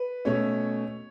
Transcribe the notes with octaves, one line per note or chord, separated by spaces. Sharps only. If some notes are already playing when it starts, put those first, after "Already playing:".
Already playing: B4
B2 A3 C#4 C#5